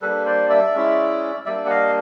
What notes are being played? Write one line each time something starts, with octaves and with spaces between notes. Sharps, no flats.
G3 A#3 D4 A4 B4
C5 D5
D5 E5
G#3 C#4 E4
G3 A#3 D4 D5 E5
F#5
D#5 F5